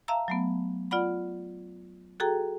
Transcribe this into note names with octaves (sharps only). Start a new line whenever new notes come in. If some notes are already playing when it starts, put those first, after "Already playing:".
E5 F5 A5 A#5 E6
F#3 A3 B3
F4 D5 F#5 B5
F#4 G#4 A4 G5 A#5